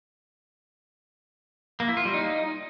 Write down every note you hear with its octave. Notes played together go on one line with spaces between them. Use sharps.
A#3
E4
F4
G3
D#4